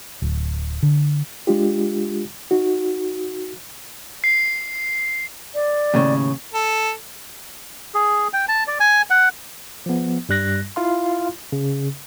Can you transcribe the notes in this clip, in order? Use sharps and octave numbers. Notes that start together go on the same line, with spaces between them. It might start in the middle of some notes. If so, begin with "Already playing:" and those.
D1
D3
G#3 D4 F4 G4
D#4 F#4
C7
D5
D#2 A2 C#3
A4
G#4
G5
A5
D5
G#5
F#5
F3 B3
G2 G3 F#6 A#6
E4 F4 F5 C6
C#3